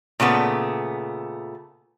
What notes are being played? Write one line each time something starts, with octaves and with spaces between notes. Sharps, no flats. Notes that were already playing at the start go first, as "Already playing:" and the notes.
A#2 C#3 A3 B3